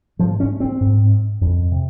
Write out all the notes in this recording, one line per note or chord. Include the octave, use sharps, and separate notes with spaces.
G#2 F3
C#4
C4
G#2
F2
C3